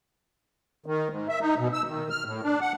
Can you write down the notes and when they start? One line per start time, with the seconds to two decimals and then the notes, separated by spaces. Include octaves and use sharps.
0.86 D#3
1.10 G#2
1.28 E5
1.41 D#4
1.59 B2
1.73 E6
1.87 D#3
2.10 F6
2.25 A2
2.43 D4
2.61 F#5